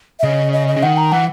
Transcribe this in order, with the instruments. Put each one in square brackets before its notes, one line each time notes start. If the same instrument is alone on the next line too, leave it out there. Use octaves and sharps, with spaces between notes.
[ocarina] E5
[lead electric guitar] C#3 [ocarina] D#5
[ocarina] D#5
D#5
[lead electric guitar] C#3
[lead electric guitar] D#3 [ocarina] F#5
[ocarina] A#5
[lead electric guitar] E3 [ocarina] F#5